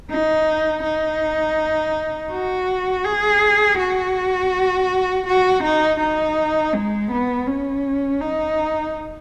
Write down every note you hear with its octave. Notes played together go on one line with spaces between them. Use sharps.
D#4
D#4
F#4
G#4
F#4
F#4
D#4
D#4
G#3
B3
C#4
D#4